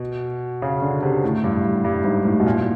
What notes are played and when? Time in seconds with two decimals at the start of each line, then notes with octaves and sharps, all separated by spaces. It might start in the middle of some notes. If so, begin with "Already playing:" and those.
Already playing: B2
0.62 C#3
0.82 D3
1.02 C3
1.24 A2
1.44 G2
1.84 G2
2.04 G#2
2.25 A2
2.40 B2
2.46 A#2